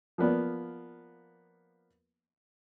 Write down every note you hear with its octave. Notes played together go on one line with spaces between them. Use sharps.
F3 A#3 B3 D5